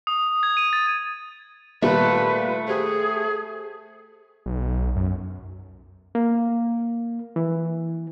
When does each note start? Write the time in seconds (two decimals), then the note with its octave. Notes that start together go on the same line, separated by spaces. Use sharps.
0.07 D#6
0.43 G#6
0.57 D#7
0.73 A6
1.82 A#2 D#3 G3 A3 B4
2.68 G4 G#4 C5
4.46 B1
4.96 F#2
6.15 A#3
7.36 E3